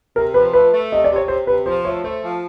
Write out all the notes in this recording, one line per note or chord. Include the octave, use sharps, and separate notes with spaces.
C3 A#4
F3 B4
A3 B4
A3
C3 D#5
D5
C3
C#5
C3 C5
C3 B4
F3 C5
A3 C#5
A3 C5
F3